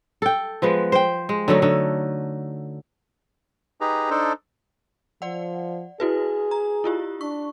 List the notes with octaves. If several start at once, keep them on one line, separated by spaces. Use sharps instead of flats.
A4 G5
F3 G#3 B3
C5 G5
G#3
D3 F#3 A3 D#4
D3 D#4
D#4 G4 G#4 B4 A#5
D4 D#4 A4 C5
F3 D5 F#5
E4 F#4 G#4 B4
A#5
E4 F4 G4
D4 C#6